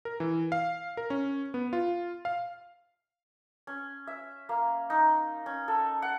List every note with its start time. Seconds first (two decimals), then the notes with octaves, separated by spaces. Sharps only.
0.05 A#4
0.20 E3
0.52 F5
0.97 A#4
1.10 C#4
1.54 B3
1.73 F4
2.25 F5
3.67 C#4
4.07 E5
4.49 A#3
4.90 D#4
5.46 C#4
5.68 A4
6.02 F#5